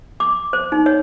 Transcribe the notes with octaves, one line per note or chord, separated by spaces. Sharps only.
D6
C5
D#4
C#5